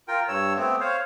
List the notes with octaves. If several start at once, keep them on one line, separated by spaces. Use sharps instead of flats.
F4 A#4 G5
G2 C#5 E6
A3 B3 C4
C5 C#5 F5